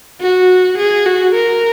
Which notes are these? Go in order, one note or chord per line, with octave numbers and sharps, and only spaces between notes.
F#4
G#4
F#4
A#4